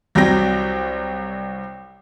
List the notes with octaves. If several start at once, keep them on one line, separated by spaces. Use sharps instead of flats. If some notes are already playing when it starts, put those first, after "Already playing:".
C2 F#3 G3 C4 G5 A#6